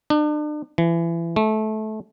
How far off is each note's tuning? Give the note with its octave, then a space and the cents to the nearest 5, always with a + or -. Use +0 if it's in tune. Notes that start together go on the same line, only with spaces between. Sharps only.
D4 +40
E3 +30
A3 -20